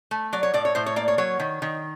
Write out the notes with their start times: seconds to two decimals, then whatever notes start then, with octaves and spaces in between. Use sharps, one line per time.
0.11 A3
0.33 F#3 D5
0.43 C#5
0.54 A2 D5
0.65 C#5
0.75 A2 C5
0.86 C#5
0.96 A#3 D5
1.08 C#5
1.18 F#3 C#5
1.40 D#3
1.62 D#3